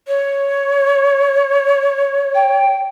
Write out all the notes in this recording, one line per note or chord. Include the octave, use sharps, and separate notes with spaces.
C#5
G5